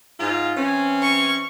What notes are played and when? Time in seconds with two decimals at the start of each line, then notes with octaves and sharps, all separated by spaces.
0.19 G#2 F4
0.57 E3 C4 C#4
1.02 C#6